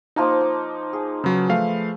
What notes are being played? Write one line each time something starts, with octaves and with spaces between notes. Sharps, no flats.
F3 A#3 D#4 A5
D6
G#4
C#3 F#3 B4 B5
F3 A3 F5